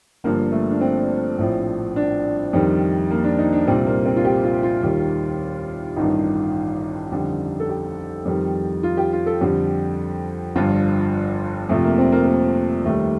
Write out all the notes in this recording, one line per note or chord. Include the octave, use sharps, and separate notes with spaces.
G1 G2 F3 A#3
A3
D4
C4
A#1 A2 F3
D4
F2 D#3 G3
A#3
D4
D#4
D4
C2 A#2 G3 C4
A#3
C4
F4
G4
F4
F4
D#2 D#3 G3
A1 G2 D#3 D#4
F2 D3 G3
A4
G4
F2 D#3 G3
F4
G4
F4
A4
F2 D3 G3 G4
G1 G2 F3 F4
F2 C3 F3 A3
A#3
C4
A#3
A#3
D#2 D#3 G3 A3